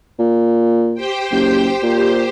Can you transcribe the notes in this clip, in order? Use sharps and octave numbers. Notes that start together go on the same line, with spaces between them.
A#2
G4 C5 G5
F#1
A#2 G4 C5